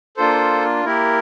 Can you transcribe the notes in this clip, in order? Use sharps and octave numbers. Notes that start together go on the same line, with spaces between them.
A#3 D4 F4 A4 C5
A#3 E4 G4 A#4